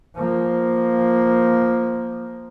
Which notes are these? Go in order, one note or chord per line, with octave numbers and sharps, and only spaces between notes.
F3 A#3